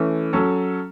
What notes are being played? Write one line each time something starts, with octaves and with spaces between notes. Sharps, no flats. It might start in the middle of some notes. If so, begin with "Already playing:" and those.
Already playing: E3 A3 C#4
F#3 C#4 A4